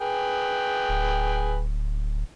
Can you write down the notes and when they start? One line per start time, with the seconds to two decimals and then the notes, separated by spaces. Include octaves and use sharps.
0.01 G#4 B4 G5
0.89 D1